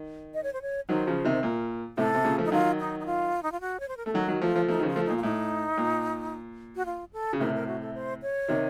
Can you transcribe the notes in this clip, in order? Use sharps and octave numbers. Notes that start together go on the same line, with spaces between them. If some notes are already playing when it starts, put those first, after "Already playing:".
Already playing: D#3
D#5
C#5
C5
C#5
D#3 F#3 C5
C#3 F3
C3 D#3
C5
A#2 A#4
A2 C3 A4
C3
A#2 C#3
F3 A3
D#4
D#3 F#3 F4
D#4
D#4
F4
D#4
F4
F#4
C#5
C5
A#4
A3 A4
D#3 F#3 F#4
D#3 F#3
F3 A3 F4
F3 A3
F3 A3 D#4
D#3
C#3 F3
F4
F3 A3
A#2 D#4
F4
A2 D#4
A#2
F#4
F4
A4
C#3
A2 C3 A#4
A#4
F#4
A4
C5
C#5
C3 D#3